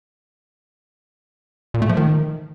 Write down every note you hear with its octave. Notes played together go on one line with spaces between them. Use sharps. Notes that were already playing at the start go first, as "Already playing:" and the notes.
A#2
A3
F3
D#3